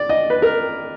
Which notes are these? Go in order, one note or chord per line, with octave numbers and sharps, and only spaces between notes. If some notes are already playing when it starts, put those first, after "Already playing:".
Already playing: D5
D#5
B4
A#4